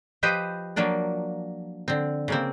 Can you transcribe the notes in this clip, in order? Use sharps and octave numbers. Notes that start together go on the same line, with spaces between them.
F3 G4 B4 C5 D#5
F3 F#3 A#3 D4 D5
D3 C4
C#3 A#3 C4